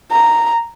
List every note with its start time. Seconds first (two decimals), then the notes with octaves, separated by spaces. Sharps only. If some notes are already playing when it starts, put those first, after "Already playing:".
0.12 A#5